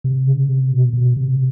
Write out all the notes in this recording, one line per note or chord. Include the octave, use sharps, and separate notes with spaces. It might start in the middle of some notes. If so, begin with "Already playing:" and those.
C3
C#3
C3
B2
B2
C3